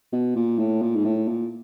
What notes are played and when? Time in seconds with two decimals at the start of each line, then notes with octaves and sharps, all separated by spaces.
0.13 B2
0.36 A#2
0.59 A2
0.82 A#2
0.95 G#2
1.05 A2
1.28 A#2